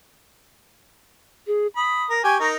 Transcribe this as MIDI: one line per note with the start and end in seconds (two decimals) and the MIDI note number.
1.47 1.67 68
1.76 2.04 83
1.76 2.14 87
2.10 2.23 70
2.24 2.35 67
2.24 2.35 80
2.24 2.47 85
2.40 2.56 63
2.40 2.56 70